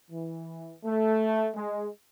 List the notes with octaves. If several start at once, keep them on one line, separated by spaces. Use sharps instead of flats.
E3
A3
G#3